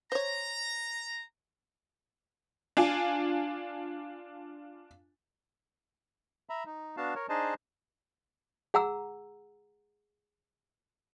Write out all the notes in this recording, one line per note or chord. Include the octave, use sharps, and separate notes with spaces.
C5 C#5 A#5
D4 F4 G#5
E5 A#5 B5
D#4
B3 D4 F#4 F5 A5
A#4 C#5
D4 D#4 G#4 C5 D#5 A5
G#4 F#5 A#5 E6